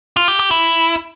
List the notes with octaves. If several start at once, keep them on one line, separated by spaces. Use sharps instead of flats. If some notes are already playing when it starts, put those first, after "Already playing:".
F4
G4
G4
E4